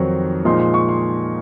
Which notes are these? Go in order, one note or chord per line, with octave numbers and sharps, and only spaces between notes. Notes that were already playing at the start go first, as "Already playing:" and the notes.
Already playing: F2 D#3 F#3 C4
A#2 F3 G#3 D#4 C6
C6
C#6
C6